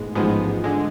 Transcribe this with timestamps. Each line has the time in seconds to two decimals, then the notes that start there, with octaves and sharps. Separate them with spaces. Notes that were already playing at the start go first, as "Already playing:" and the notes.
Already playing: A1 G#2 G#3 B3
0.15 A1 G#2 F3 G#3 B3
0.64 D3 G#3